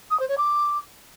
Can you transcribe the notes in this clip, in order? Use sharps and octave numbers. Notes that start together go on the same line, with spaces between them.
D#6
C5
C#5
D6